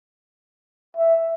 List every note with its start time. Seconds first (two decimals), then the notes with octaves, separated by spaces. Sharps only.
0.97 E5